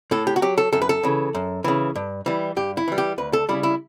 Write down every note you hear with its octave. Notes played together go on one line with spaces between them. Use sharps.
A2 A4
G4
F#4
F#3 G4
A4
F#2 A4
B4
A4
C#3 E3
F#2
C#3 E3
G2
E3 G3
G2 G4
E4
E3 G3
G4
D2 B4
A4
C#3 G3 E4
E4